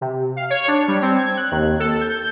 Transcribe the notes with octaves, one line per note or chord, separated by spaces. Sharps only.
C3
F5
C#5
D4
G3
C4
G#6
F#6
D#2
A4
G6